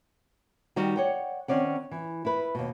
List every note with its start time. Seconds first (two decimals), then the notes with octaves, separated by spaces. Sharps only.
0.76 D#3 G3 D#4 F#4
0.97 C#5 D5 F#5 G5
1.48 D#3 C4 C#4 D5 F#5
1.91 E3
2.25 E4 B4
2.55 D#2 B2